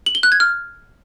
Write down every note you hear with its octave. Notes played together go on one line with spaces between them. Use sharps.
F#7
G7
F#6
G#6
F6